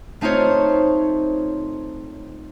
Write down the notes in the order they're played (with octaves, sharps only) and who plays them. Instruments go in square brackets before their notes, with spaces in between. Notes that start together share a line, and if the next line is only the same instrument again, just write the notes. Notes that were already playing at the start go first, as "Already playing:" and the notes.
[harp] A3 C4 D#4 F4 C5 C#5